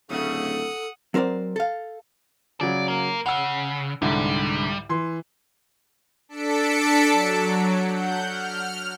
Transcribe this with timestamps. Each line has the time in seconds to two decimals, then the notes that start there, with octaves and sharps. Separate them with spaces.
0.10 D1 C#3 A3 A4 F#5 D#6
1.14 F#3 C4 A#4 C5 D5
1.56 A4 F5
2.61 C#3 F#3 D5
2.88 A#3 A#4
3.26 C#3 F#5 E6
4.02 C2 G#2 D3 G3
4.89 E3 C6
6.29 D4 A4 A5 B6 C#7 D7
7.11 F#3
7.89 F#5 G6
8.26 F6